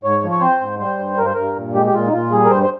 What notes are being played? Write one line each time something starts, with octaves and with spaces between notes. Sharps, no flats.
G#2 C#5
F3
C#5
C4 C5
G#2
G3 C5
G2
G2 A#4
C5
G2 A#4
A#2
G#3 G4
G4
A#2 F4
D#4
A#2 F4
G3 G#4
A#4
G2 C5
C5